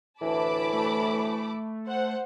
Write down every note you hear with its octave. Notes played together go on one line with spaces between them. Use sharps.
D2 A2 E3 A5 B5 D6
A3
C5 F#5